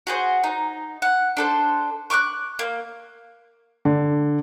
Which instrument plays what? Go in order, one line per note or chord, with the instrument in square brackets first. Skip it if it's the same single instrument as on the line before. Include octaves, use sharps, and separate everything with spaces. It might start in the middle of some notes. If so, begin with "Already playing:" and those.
[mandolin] F#4 G#4 C5
D#4
F#5
D4 A4 C5
C#6 D6 F6 F#6
A#3
[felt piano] D3